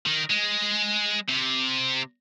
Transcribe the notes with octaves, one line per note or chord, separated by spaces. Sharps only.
D#3
G#3
C3